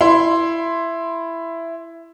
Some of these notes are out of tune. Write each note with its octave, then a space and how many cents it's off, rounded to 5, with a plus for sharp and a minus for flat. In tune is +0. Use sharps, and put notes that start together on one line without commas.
E4 +10 C6 +0